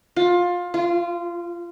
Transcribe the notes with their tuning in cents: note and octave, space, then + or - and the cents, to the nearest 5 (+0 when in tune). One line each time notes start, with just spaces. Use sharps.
F4 +20
F4 -20